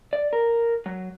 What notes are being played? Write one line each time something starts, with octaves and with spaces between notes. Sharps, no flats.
D5
A#4
F#3